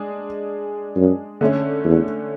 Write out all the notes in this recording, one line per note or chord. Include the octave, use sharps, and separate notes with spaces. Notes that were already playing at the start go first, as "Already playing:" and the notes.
Already playing: G#3 D4 G#4
F#2
D3 A3 C#4
E2